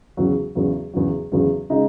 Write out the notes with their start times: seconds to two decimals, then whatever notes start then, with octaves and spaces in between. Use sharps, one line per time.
0.17 E2 C#3 F#3
0.55 E2 C#3 F#3
0.93 E2 C#3 F#3
1.32 E2 C#3 F#3
1.70 C#3 G#3 D#4